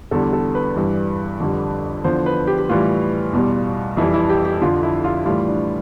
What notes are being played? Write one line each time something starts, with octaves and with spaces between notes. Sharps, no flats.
E2 D3 G3 A4
A4
B4
G2 E3 G3
F2 D3 G3
E2 D3 F3 C5
B4
G4
G4
A2 E3 G3 F4
E2 B2 G3
F2 E3 G3 E4
E4
G4
G4
F2 D3 F3 F4
E4
F4
A2 E3 G3 F4
D4